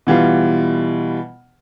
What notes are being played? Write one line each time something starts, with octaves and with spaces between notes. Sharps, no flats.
B2 E3 G3 F4